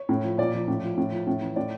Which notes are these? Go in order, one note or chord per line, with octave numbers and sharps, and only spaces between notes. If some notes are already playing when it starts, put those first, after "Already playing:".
Already playing: C#5
A2
F3
A#2 D5
F3
A2
F3
A2
F3
A2
E3
A2 D5